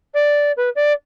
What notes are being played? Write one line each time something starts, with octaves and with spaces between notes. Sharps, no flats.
D5
B4
D5